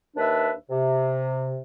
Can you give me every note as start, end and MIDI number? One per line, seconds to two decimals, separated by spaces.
0.17 0.52 39
0.17 0.52 62
0.17 0.52 71
0.17 0.52 76
0.70 1.61 48